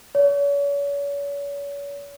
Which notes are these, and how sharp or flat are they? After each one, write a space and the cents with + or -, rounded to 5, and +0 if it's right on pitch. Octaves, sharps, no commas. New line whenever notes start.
C#5 +40